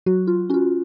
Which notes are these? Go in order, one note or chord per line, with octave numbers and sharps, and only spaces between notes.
F#3 F#4
F4
C#4 F4 F#4